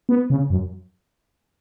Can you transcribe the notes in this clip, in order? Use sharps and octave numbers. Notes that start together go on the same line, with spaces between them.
B3
C#3
F#2